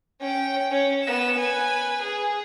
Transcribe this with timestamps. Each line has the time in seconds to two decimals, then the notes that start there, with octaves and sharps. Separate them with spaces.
0.21 C#4 G5
0.71 C#4 C#5
1.04 B3 E7
1.39 B4 G#5
2.02 G#4